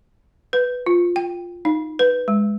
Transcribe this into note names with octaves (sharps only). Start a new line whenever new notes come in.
B4
F4
G5
D#4
B4
G#3